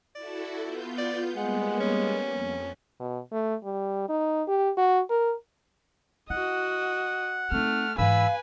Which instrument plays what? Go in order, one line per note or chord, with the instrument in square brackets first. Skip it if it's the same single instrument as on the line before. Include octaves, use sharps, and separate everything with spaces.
[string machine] E4 F#4 A4 [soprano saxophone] D5
[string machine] B3 F4 G6
[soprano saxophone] D5
[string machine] G3 A#3 B3 [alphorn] G#3 [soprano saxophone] F#5
[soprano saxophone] C#4
[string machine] F2
[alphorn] B2
A3
G3
D#4
G4
F#4
A#4
[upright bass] E4 [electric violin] F#4 D#5 [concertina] F#5
[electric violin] A3 F6 [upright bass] C4 D#4
[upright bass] G#2 E3 [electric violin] B4 G#5 [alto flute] F5 [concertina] B5 E6